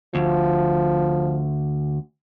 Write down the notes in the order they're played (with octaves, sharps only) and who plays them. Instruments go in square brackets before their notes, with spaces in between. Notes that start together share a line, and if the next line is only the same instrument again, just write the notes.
[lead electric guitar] D2 [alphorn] F3